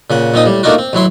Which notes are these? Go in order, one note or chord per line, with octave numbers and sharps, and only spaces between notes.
A#2 C#3 F#5
A#2 C4 D#4 D#6
A2 G3
A3 A#3 D4 D#4 F4 F#4
C4
A1 F#3 E4 C6